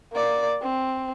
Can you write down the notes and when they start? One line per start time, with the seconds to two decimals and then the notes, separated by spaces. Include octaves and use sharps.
0.13 A#3 D5
0.63 C4